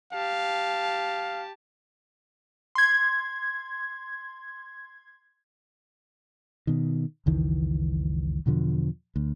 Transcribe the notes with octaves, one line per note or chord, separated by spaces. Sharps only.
G4 F5 A5
C6 G#6
B2 D#3
F#1 C#2 D#3 E3
E2 B2 D3 F3
D2